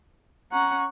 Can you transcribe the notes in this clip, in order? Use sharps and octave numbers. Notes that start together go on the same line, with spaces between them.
C#4 F#5 A#5 C#6